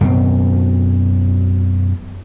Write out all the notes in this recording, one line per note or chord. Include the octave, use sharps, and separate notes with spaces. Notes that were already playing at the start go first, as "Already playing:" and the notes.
F#2 B2 C4